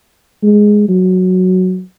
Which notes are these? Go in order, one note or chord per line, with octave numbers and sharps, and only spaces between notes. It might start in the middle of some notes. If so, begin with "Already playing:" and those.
G#3
F#3